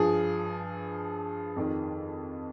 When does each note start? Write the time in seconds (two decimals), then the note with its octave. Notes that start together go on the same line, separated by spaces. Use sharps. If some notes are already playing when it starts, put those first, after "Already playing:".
Already playing: G2 F3 G#4
1.56 F2 D#3